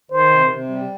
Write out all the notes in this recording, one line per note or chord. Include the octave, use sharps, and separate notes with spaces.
D#3 C5
C3
C3
G3